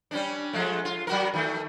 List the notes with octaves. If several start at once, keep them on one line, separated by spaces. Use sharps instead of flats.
G3 C#4 D4
F3 G#3 A3
F4
F#3 F#4 A#4
D#3 A3